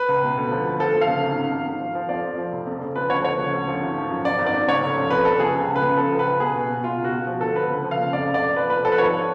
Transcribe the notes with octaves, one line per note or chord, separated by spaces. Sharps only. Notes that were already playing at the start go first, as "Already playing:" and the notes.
Already playing: B4
C#2
B2
D2
F3
D2
F3 A4
D2
F5
C#3
G#1
G#1
G#1
G#1
F3
F3
F2 D5
F3
F3
F1
F2
C#3
F3 B4
D2 C#5
F3 C#5
C#3
D2
F3
G#1
F3
F#2
F#2 D5
G#1
D5
G#1
C#3 C#5
F1
F3
F2 B4
F3 A4
C#3 G#4
C#2
C#2
B4
C#3
F3 A4
C#2
B4
C#2
B2 G#4
B2
B2
B2 F4
C#2
F#4
B2
F3
D2 A4
D2 B4
C#3
F3
F5
C#3
F2 D5
F1
D5
F1
F3 B4
F1 B4
F3 A4
B4
G#1 C#5